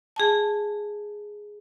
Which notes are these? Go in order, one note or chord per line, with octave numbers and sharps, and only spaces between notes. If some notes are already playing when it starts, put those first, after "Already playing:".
G#4 G#5 A5